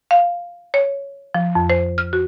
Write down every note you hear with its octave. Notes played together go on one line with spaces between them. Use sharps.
F5
C#5
F3
F2
C5
F6
F#4